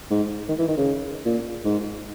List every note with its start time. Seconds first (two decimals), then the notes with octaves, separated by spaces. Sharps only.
0.11 G#2
0.49 D#3
0.59 E3
0.68 D#3
0.77 C#3
1.25 A#2
1.65 G#2